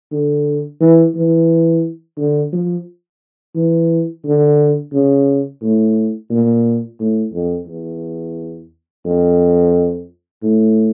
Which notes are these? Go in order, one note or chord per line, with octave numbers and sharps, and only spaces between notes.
D3
E3
E3
D3
F3
E3
D3
C#3
A2
A#2
A2
F2
E2
F2
A2